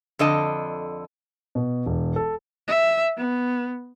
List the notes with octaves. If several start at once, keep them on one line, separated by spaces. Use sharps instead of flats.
F2 D3 D#5 A5
B2
E1
A4
E5
B3